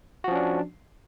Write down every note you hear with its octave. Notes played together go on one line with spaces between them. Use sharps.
F3 C#4 D4 F#4